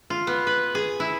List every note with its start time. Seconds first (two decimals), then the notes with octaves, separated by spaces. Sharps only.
0.10 F4
0.27 B3
0.47 B4
0.75 G#4
1.00 E4